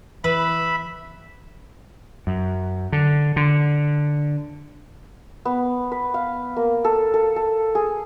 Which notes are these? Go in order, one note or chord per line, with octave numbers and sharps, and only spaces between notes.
E3 B4 E5 B5
F#2
D3
D3
B3
B4
F5
A#3
A4
A4
A4
G#4